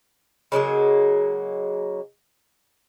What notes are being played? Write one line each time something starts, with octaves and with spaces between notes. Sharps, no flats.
C#3 F#3 G#3 A#3